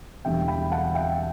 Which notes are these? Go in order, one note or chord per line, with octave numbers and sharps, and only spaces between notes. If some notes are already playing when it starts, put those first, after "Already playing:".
E1 E2 D3 G3 D4 E5 G5
G5 B5
F#5 A5
E5 G5